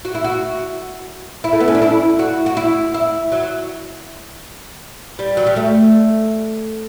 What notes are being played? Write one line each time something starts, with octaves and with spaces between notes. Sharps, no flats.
F#4
E4
F#4
E4
A3
B3
C#4
D4
E4
F#4
F#4
E4
E4
F#3
G3
F#3
G3
A3